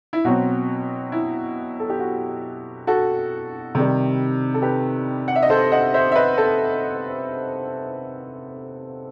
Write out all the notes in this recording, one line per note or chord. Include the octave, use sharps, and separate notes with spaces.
E4
B2 F#3 C4 F#4
E4
A4
G4
F#4
F#4 A4
C3 D#3 G3
A4
G4 B4
F#5
E5
D#5
A4 C5
D#5 F#5
C5 E5
E5
B4 D#5
A4 C5